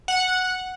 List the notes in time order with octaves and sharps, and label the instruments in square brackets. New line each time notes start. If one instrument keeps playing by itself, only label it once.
[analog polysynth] F#5